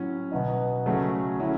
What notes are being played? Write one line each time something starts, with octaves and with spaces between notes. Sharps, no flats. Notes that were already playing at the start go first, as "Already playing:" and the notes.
Already playing: A2 F#3 C#4
B2 F#3 B3 D#4
C#3 F#3 A3 C#4 F#4
F#3 C#4 E4